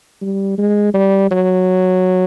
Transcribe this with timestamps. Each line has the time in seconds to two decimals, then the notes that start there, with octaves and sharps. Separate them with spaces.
0.22 G3
0.58 G#3
0.94 G3
1.31 F#3